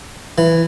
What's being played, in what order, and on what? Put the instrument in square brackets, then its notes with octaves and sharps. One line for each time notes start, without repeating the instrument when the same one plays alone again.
[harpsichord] E3